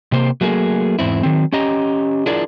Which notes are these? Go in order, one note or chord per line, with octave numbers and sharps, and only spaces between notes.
C3 A#3 C5
F#3 A3 A#3 G4 G#4
E2 G#2 C4 E4
D#3 F#3 C4
C#4 G4 D#5 A#5
D4 E4 F4 G#4 A#4 D5